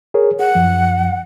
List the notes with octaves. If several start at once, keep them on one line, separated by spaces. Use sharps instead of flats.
G#4 A#4 C#5
G#4 F#5
F#2 F3